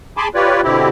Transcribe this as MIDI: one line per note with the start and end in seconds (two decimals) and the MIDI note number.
0.17 0.28 68
0.17 0.28 80
0.17 0.28 81
0.17 0.28 83
0.17 0.28 84
0.17 0.28 86
0.35 0.61 65
0.35 0.61 67
0.35 0.61 71
0.35 0.61 73
0.35 0.61 74
0.63 0.89 47
0.63 0.89 50
0.63 0.89 60
0.63 0.89 64
0.63 0.89 67